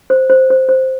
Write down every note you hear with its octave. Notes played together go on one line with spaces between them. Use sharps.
C5
C5
C5
C5